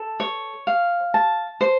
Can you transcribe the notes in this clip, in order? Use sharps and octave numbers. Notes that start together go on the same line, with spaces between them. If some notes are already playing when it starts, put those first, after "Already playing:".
Already playing: A4
C#5
F5
A5
C5